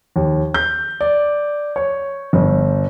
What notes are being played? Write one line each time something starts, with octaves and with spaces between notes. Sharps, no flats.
D#2
G6
D5
C#5
G1